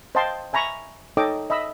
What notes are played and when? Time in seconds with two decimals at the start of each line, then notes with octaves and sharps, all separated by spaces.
0.15 C5 D#5 F5 G5 A5 C6
0.53 E5 G#5 A#5 B5 C#6
1.17 D#4 A4 C#5 D#5 G5 D6
1.50 D#5 E5 B5 E6